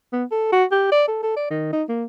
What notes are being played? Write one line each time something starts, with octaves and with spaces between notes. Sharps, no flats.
B3
A4
F#4
G4
D5
A4
A4
D5
D#3
D#4
A#3